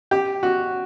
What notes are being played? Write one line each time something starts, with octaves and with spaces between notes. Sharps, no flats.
G4
F#4